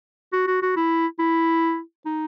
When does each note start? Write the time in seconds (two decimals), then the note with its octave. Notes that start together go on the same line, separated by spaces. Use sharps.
0.33 F#4
0.47 F#4
0.62 F#4
0.76 E4
1.19 E4
2.06 D#4